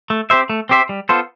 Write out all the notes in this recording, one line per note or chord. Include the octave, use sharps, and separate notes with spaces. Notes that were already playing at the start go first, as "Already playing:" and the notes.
A3
C4 G4 C5 E5
A3
C4 G4 C5 E5
G3
B3 F4 A4 C5